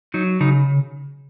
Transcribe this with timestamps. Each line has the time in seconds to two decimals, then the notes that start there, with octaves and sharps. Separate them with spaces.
0.14 F#3 D#4
0.40 C#3 D#4